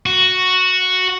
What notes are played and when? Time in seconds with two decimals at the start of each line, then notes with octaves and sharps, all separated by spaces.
0.06 F#4